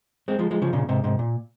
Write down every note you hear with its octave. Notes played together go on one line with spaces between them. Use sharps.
G#3 C4
F3 G#3
F3 G#3
C#3 F3
A#2 C#3
G#2 C3
G#2 C3
A#2